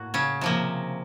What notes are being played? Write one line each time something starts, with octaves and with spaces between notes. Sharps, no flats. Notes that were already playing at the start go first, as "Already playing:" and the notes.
Already playing: A2 A#3 F#4
C#3 C#4
C3 F3 A#3